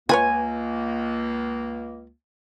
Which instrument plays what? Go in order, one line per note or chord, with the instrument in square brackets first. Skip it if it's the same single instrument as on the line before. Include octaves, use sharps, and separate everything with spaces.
[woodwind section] C#2 A#3 [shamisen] F4 B4 C#5 [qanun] G#5